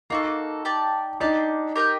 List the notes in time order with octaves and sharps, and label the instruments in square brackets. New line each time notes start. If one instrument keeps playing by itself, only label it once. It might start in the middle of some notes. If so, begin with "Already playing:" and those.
[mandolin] A#3 F#4 A4 [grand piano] D#4
[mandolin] G4 D5 A5
[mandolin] D4 G4 D5 A5 [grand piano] D#4
[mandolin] G4 A#4 D#5 G5